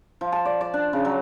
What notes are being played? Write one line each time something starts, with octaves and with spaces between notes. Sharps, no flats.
F3
A5
D5
D5
D4
C#3
F#3